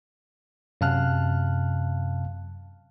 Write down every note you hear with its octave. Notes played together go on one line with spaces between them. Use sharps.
F#2 C3 F5 A5 F6 F#6